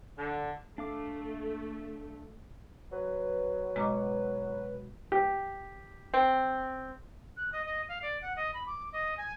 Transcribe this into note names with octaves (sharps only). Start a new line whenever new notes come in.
D3
A3 D4 F5 D6
F#3 B4
B2 G#3 A#5 D6
G4
C4
F#6
D#5
D#5
F5
D5
F#5
D#5
B5
D6
D#5
G#5